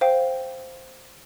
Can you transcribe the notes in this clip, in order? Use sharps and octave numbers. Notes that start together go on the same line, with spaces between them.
C5 F5 G5